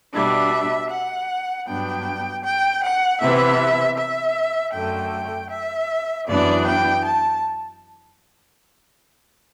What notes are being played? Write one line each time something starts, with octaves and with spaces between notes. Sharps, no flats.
B2 G3 D4 E5
F#5
G2 F#3 B3 D4 G5
G5
F#5
C3 E3 B3 E5
E5
F#2 D3 A3 G5
E5
F#2 E3 B3 D4 D5
G5
A5